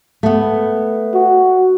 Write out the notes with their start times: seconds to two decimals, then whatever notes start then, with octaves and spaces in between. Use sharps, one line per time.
0.23 A3 B3
1.14 F#4